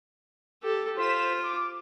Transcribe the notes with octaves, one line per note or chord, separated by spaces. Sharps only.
G4 A4
F4 C5 B6 E7
D6